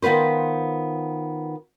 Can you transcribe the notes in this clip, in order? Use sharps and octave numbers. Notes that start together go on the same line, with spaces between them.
D#3 B3 F4 B4 C5